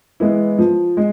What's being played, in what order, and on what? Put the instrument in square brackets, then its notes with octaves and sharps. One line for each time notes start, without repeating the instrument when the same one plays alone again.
[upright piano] E3 G#3 B3 E4
F3
G#3